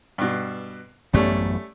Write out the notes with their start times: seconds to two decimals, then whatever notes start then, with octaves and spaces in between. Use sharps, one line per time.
0.18 G2 B2
1.13 A1 F#2 G3 A3 B3 C#4